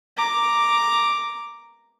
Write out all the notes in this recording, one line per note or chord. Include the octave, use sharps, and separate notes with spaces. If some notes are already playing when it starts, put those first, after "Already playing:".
A#5 D6